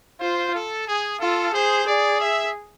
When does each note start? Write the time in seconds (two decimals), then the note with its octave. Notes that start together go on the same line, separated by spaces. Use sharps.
0.21 F4 C5
0.54 A4
0.88 G#4
1.20 F4 A4
1.54 G#4 C5
1.87 G#4 D5
2.20 E5